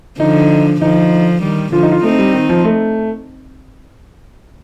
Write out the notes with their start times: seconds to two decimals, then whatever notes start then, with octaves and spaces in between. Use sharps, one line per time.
0.19 D3 F3 D#4
0.81 D3 F3 D#4
1.42 D#3 G3
1.72 D3 F3 F4
1.83 D#4
1.92 F4
2.03 A3 C4 D#4
2.19 G3
2.34 D#3
2.49 F3
2.65 A3